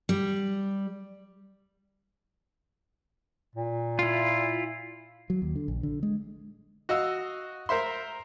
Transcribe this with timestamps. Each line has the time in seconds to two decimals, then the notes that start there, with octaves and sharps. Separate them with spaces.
0.09 G3
3.55 A#2
3.99 E4 F4
5.30 F#3
5.42 D#2
5.56 D3
5.68 A#1
5.83 D3
6.03 G#3
6.89 F#4 D#5 F5 E6
7.69 A#4 C5 E5 C6